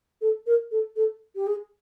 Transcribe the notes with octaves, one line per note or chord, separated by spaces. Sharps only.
A4
A#4
A4
A4
G4
G#4